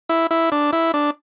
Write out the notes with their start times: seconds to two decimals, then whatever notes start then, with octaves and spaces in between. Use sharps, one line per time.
0.09 E4
0.31 E4
0.52 D4
0.73 E4
0.94 D4